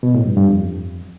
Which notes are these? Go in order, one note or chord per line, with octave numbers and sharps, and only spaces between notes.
B2
A2
G2
G2
F2